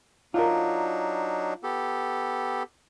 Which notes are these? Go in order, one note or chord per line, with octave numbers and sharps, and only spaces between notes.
F#3 D4 D#4 F4 A#4
B3 G4 A4